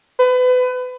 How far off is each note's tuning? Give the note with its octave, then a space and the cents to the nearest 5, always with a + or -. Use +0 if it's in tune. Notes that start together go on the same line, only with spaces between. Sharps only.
B4 +30